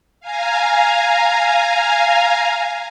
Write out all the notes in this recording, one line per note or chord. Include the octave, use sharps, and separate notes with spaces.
F5 G#5 A#5